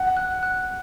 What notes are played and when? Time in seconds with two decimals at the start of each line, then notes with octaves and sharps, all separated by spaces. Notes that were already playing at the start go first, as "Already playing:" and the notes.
Already playing: F#5
0.17 F#6
0.43 F#6